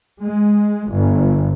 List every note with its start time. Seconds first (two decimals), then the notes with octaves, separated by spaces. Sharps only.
0.22 G#3
0.90 G1